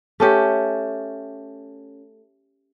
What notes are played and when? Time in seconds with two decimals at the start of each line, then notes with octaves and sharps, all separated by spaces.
0.20 A3 C#4 G4